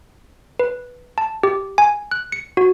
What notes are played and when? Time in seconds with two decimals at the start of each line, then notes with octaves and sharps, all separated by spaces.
0.59 B4
1.18 A5
1.43 G4
1.78 G#5
2.11 F#6
2.32 C#7
2.57 F#4